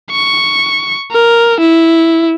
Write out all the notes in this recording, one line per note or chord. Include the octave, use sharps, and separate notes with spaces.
C#6
A#4
E4